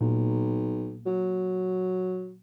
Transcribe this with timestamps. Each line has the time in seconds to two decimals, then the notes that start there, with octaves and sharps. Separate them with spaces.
0.01 B1 A#2
1.06 F#3